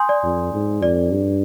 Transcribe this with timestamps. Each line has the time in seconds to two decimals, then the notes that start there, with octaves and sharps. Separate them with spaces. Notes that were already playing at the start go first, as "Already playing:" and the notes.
Already playing: G#5 C6 D#6 G6
0.09 D5
0.23 F2
0.53 G#2
0.82 F2 D5
1.11 G2